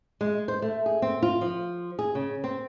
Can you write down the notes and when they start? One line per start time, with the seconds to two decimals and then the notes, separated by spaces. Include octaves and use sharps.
0.21 G#3
0.48 C5
0.62 A3
0.86 G#4
1.02 C4
1.22 F4
1.41 F3
1.99 G#4
2.15 C#3
2.44 C4